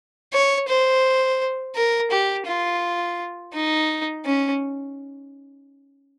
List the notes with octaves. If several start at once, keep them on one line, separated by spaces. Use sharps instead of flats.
C#5
C5
A#4
G4
F4
D#4
C#4